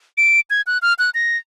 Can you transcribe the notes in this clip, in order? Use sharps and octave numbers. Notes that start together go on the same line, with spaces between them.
D7
G#6
F#6
F6
F#6
A#6